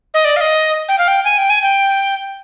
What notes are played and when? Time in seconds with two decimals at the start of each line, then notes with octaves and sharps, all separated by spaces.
0.14 D#5
0.25 D5
0.36 F5
0.41 D#5
0.89 G5
0.98 F5
1.08 G5
1.25 G#5
1.38 G5
1.50 G#5
1.63 G5